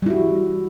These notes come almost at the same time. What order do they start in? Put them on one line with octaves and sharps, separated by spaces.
G3 E4 F#4